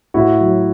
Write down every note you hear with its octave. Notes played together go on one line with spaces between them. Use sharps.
A2 E4 F#4
F#3